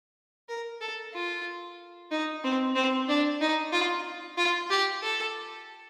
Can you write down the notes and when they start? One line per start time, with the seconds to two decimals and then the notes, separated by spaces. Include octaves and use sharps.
0.49 A#4
0.81 A4
1.14 F4
2.11 D#4
2.44 C4
2.75 C4
3.09 D4
3.41 D#4
3.72 F4
4.37 F4
4.70 G4
5.03 A4